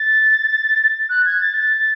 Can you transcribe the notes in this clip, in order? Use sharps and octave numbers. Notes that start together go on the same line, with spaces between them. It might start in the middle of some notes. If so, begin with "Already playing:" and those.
Already playing: A6
F#6
G#6
A6
A6